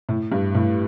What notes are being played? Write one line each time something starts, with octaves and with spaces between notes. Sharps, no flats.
A2
G2
A2